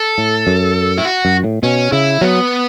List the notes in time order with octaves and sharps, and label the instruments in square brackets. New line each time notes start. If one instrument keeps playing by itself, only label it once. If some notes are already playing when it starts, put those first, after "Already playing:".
Already playing: [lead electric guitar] A4
[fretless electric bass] A2
F#2
[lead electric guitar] E4
F#4
[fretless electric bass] F#2
A2
[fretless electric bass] B2 [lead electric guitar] C#4
[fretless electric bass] C#3 [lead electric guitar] E4
[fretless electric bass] F#3 [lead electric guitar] B3